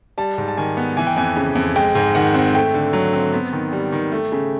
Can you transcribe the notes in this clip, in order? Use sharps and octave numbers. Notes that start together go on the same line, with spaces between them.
G3 A5
G#2
A5
D#3 G#5
B3
E3 G#5
G5
F2 G#5
C#3
F2
G#3 G5
G#2
D#3 F#5
C4
A3 G5
D3
F#3
C4
B3
D#3
G3
D#3
A3
C#3